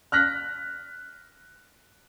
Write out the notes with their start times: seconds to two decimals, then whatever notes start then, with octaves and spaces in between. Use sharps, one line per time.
0.12 F6 F#6 A#6 B6